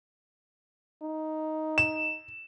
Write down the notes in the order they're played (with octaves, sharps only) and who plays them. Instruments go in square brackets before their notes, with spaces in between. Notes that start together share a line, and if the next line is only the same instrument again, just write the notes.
[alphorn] D#4
[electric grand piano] E7